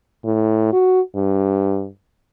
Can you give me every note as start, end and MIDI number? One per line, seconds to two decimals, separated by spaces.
0.25 0.72 45
0.73 1.01 66
1.16 1.88 43